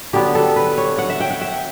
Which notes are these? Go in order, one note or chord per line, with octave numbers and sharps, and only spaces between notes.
D3 F#3 B3 D4 G4
A4
B4
C#5
F#5
E5
G5
F#5
E5